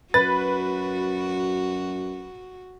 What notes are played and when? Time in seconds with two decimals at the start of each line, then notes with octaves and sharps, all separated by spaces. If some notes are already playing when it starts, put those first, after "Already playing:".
0.14 F#2 F#4 B4 A6